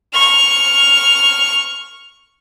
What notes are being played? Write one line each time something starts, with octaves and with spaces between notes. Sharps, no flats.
C#6 F6